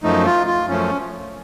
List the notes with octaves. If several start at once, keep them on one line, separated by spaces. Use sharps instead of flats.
F#2 F3 A3 D#4
F4
F4
F#2 F3 A3 C#4